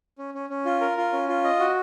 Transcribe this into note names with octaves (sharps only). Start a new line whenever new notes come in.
C#4
C#4
C#4
F4
A#4
F4
C#4
F4
D#5
F#4